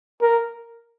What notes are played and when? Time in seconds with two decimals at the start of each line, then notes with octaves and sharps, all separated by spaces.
0.21 A#4